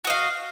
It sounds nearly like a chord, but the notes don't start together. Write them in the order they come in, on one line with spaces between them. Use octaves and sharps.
F#4 D#5 F5